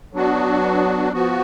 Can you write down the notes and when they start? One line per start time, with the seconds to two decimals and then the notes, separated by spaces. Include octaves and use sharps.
0.13 F#3 B3 D4 F#4
1.13 F3 B3 F#4